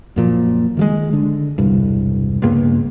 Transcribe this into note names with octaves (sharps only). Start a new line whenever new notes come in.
F#2 A#2 F3
D#3 F3 G#3
D3
E1 C2 G2
C#2 G2 A#3 B3